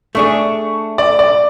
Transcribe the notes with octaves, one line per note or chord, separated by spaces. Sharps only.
A3 D4 G#4 C#6
D5
D5